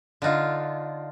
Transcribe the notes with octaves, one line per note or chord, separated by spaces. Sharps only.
D3 D4 D#4 F4